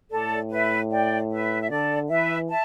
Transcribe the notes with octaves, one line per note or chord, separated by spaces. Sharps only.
A2 A4 D5
B4 E5
D5 G5
B4 E5
E5
D3 A4 D5
E3 B4 E5
E5 A5